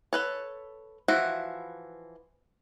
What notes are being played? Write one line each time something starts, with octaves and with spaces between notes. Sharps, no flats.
A4 B4 C#5
E3 F3 E4 F#4